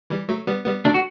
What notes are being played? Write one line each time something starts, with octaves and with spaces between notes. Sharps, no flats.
E3 G3
F#3 A3
G3 B3
G3 B3
F#3 A3 D4
F#4